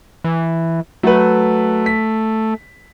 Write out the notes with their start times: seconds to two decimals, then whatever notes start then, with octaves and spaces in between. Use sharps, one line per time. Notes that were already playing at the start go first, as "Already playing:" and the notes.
0.24 E3
1.03 F#3 A3 B4
1.86 B6